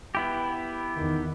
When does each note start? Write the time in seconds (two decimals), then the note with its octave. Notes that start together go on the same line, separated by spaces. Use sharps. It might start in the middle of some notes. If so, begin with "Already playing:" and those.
0.15 B3 E4 G4
0.96 E2 D#3